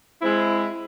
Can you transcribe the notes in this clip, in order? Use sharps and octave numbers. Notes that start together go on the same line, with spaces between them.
G#3 C4 E4